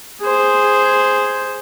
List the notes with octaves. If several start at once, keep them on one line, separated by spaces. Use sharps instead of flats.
G#4 C5